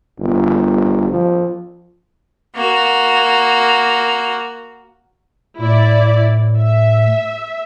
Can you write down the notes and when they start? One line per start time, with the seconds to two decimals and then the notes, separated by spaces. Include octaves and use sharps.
0.19 G1
1.10 F3
2.56 A#3 F#4
5.58 A2 E4 D5
6.58 E5